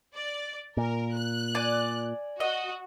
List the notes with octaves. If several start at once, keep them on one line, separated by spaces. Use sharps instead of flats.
D5
A#2 A#4
F#6
D5 G#5
F#4 D#5